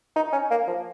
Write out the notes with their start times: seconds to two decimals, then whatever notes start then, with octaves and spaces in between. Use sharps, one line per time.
0.16 D#4
0.32 C#4
0.51 A#3
0.67 F3